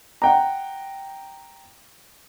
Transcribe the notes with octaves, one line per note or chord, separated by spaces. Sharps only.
F#5 G5 A#5